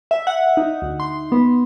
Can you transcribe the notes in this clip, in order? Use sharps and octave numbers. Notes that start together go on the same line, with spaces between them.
E5
F#5
D#4
D2
C6
B3